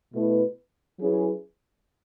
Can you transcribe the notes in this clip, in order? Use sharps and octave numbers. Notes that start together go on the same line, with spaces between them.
B2 A3 E4 B4
F#3 C#4 E4 G#4 B4